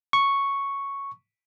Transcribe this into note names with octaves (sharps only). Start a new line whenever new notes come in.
C#6